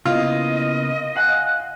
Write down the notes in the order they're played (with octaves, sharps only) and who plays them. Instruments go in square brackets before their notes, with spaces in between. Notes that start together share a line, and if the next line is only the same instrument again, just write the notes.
[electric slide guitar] C#3 A#3 B3 [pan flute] E4 [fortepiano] F4 [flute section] D#5
[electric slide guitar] F5 F#5 G#5 [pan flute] F#6